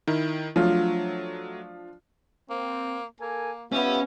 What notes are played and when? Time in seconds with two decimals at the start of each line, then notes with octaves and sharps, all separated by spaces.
0.07 D#3 E4 A#4
0.56 F3 F#3 A3 D4 F4
2.50 A#3 C4
3.20 A#3 A4 A#4 G#5
3.72 G3 B3 C#4 F4 G4 E5